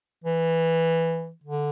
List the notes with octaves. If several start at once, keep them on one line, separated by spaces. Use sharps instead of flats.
E3
D3